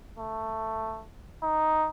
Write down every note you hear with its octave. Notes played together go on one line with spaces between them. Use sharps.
A3
D#4